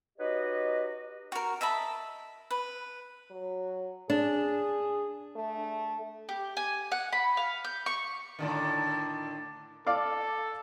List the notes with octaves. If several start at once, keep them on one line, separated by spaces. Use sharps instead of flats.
D#4 F#4 G4 B4 C#5 D#5
F#4 A#4
D#5 E5 A5 B5
B4
F#3
D4 G#4
A3
G4
G#5
F#5
B5
F5
G6
C#6
A2 D3 D#3
A4 D5 F5 D6